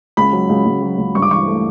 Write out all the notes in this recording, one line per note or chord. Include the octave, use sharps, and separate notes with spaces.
C#2 B5
F#3
C#2
C#2
F#3
C#2
G2 C#6
D6
E3 C#6
A3